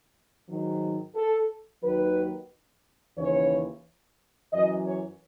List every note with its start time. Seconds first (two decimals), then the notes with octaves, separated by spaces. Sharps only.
0.48 G#2 D#3 F#3
1.15 A4
1.82 D#2 D#3 F#3 B4
3.17 D#2 C#3 E3 C#5
4.52 F#2 E3 D#5
4.86 C#5